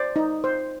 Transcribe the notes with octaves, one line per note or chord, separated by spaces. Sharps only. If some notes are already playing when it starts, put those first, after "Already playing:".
Already playing: C5 D5
D#4
C5